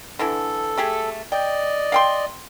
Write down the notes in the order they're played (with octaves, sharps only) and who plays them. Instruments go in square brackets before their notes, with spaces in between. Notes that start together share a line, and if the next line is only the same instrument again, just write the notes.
[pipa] D3 E3 E4 [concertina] A4
[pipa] A3 G4 G#4
[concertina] D5 D#5 [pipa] G5
[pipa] F5 G5 C6